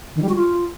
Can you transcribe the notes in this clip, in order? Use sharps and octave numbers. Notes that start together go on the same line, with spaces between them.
D#3
G3
F#4
F4